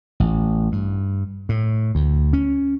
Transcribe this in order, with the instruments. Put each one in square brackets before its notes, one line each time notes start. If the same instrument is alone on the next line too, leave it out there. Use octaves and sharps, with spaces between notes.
[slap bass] A1
G2
A2
D2
C#4